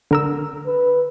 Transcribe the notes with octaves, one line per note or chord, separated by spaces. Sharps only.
D3 A#4 E6
B4